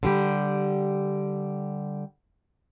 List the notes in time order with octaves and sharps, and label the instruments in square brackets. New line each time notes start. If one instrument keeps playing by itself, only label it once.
[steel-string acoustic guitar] D3 G3 G4